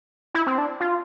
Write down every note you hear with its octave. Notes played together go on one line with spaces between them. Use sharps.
E4
C4
D4
F4